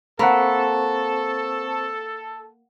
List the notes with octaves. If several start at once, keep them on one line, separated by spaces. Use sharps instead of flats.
A#3 C4 A4 C5 F#5 B5 C#6